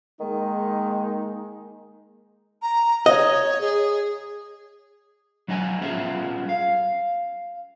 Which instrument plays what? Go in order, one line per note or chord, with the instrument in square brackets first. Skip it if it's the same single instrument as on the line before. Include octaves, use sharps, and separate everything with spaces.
[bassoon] D#3 [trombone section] G#3 A#3 D#4
[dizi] A#5
[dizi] C#5 [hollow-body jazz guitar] D#5
[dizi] G#4
[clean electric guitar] F#3 D#4 D#5 G#5
G3 B3 C#4 F4 G#4 E5
F5